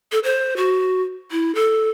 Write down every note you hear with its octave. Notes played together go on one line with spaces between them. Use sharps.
A4
C5
F#4
E4
A4